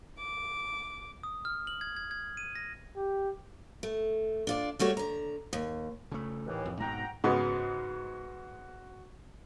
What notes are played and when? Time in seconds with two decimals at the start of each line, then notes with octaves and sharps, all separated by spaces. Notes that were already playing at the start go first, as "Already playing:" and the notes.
0.18 D6
1.23 D#6
1.45 F6
1.67 F#7
1.81 G#6
1.96 G#6
2.11 G#6
2.37 D#7
2.55 A#6
2.96 G4
3.83 A3
4.47 D4 F4 D5
4.79 G3 A3 F#4 C#5
4.97 D3 A#5
5.53 D#2
6.12 C#3 A3
6.46 D#2 A2 E3
6.66 F2
6.80 G#2 B2 F#5 G5 A#5
7.24 G#2 C#3 B3 F#4